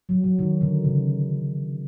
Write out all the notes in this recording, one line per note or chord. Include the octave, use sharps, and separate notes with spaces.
F#3
F#3
D#3
D3
C#3